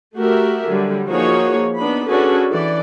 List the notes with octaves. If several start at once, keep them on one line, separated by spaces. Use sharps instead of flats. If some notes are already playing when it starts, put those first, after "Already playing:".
A3 F#4 G4 A#4 E5
D3 F#3 G3
F3 A#3 D#4 F#4 G#4 C#5
B3 D4 D#4 B5
C#4 D4 F#4 G#4 A4 B4
E3 A4 D5